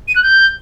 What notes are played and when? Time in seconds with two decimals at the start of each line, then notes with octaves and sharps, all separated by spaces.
0.08 D#7
0.16 F#6
0.23 G6